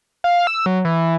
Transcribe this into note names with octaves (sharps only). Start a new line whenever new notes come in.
F5
E6
F#3
E3